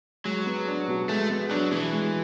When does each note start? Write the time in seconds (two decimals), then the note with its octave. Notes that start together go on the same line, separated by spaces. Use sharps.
0.25 F#3 G#3
0.46 B3
0.67 D4
0.88 B2
1.09 G#3 A3
1.30 B3
1.50 F#3 D4
1.72 B2 E3
1.93 G#3